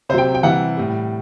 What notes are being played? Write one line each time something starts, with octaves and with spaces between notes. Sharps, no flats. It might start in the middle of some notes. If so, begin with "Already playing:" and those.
C3 F#3 C5 G5
G5
C3 E3 G3 F#5
A2 G3